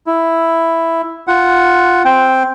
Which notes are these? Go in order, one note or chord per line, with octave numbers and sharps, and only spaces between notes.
E4
F4 F#5
C4 G5